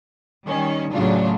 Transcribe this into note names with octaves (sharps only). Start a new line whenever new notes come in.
D#3 G3 C#4
A2 C#3 F#3 D4 F4